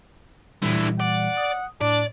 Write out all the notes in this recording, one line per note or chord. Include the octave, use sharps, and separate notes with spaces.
A#2 D3 E3 G3 E4
D5 F#5
D#6
A2 D4 D5